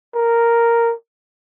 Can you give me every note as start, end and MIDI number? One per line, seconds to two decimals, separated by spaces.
0.15 0.94 70